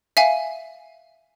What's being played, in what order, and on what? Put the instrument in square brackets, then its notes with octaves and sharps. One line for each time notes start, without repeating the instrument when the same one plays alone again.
[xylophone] E5 F5 G#5